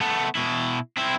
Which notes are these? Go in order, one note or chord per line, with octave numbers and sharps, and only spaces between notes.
A3 B3
B2 E4
C4 E4